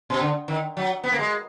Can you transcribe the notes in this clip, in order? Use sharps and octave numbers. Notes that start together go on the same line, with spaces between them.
B2
D3
D#3
F#3
B3
A#3
G#3